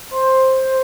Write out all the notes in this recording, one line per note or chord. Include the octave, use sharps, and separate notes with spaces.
C5